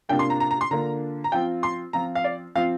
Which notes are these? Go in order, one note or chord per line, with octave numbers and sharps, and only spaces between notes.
C3 A#3 D4 F4 G5
C6
A#5
A#5
A#5
C6
D3 A#3 D4 F4 A#5
A#5
F3 C4 F4 G5
C6
F3 C4 F4 A#5
F5
D5
F3 C4 F4 F5